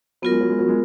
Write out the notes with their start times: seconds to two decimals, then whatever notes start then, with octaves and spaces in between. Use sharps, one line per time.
0.22 F#3 B3 F4 A#4
0.32 G#3
0.41 F#3
0.50 G#3
0.59 F#3
0.68 G#3